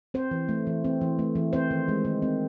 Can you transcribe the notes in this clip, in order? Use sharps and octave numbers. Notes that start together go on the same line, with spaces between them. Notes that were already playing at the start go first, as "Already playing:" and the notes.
C4 C5
E3
A3
E3
C4
E3
A3
E3
C4 C5
D#3
G#3
D#3
C4